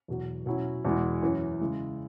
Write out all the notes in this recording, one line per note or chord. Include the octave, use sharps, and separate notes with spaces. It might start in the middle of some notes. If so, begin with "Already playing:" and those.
E2 B2 F#3
B2 F#3 C#4 E4
E2 B2 G#3 E4
F#2 E3 C#4
C#3 G#3 E4